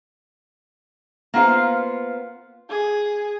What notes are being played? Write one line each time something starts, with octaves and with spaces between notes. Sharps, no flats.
A#3 B3 F4 C5 F5
G#4